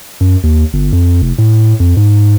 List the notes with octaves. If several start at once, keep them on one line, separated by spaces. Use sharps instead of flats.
F#2
D#2
G1
F2
F1
A2
F2
G#2